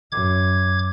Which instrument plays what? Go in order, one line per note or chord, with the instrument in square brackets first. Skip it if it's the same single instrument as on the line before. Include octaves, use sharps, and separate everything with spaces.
[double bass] F#2 [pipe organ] D6 G#6